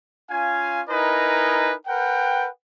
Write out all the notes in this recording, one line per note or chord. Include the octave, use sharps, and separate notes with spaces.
C#4 F4 F5 G#5
D#4 E4 A#4 B4 D#5 G#5
A#4 B4 F#5 G5